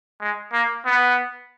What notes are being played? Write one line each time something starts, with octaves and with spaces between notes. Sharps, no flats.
G#3
A#3
B3